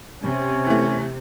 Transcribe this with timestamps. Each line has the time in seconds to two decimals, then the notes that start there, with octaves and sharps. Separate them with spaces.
0.23 C3 C#4
0.67 E3 A3